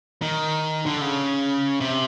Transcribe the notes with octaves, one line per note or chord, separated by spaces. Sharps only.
D#3
D3
C#3
C3